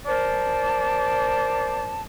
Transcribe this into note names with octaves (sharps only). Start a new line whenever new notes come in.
A#4 C5 D5 A5